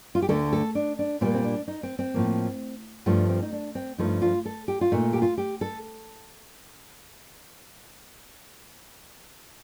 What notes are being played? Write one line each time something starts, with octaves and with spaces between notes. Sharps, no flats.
F4
G4
D2 D3 A3 A4
A4
D4
D4
A#2 G3 A#3 C4
C4
D4
D#4
C4
C4
A2 F3 A#3
G2 F3 A3 D4
C4
D#4
D4
C4
G2 F3 A3 D#4
F4
A4
G4
F4
A#2 A3 D#4
G4
F4
G4
A4